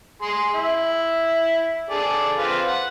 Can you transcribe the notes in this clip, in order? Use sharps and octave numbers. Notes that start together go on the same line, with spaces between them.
G#4 C6
E4
G#4 A4 D5
C4 F4 B4
F#5